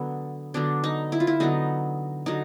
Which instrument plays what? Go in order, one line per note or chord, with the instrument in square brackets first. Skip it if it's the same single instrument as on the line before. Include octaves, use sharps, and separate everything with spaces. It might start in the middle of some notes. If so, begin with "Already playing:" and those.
Already playing: [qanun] D3 F#3 B3
D3 F#3 B3 D4
D#4
E4
F4
E4
D3 F#3 B3 D#4
D3 F#3 D#4